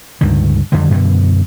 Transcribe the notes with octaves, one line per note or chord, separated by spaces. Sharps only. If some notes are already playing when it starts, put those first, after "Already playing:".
C#2 G2 D3 D#3
F2 D3 D#3 G3
F#2 B2 D3